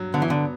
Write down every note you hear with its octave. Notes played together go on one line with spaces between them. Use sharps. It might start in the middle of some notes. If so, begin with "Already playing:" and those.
Already playing: G2 F#3
D3 B3
E3
D3